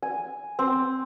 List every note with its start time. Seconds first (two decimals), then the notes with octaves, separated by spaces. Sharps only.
0.02 G#5
0.59 C4